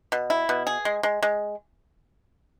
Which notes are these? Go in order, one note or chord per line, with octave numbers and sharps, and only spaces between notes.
B2
E4
B2
G#4
G#3
G#3
G#3